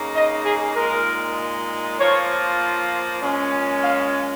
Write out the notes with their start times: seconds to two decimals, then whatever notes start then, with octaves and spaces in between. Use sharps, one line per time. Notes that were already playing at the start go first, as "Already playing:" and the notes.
Already playing: C#3 A#3 D#4
0.15 D#5
0.45 G#4
0.76 A#2 G#3 D#4 A#4
1.99 F3 A#3 F4 C#5
3.22 A#2 G#3 C#4
3.83 F5